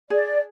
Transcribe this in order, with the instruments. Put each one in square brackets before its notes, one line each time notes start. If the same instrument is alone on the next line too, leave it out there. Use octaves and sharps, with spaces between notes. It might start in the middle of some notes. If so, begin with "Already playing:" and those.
[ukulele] G#4 [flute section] D5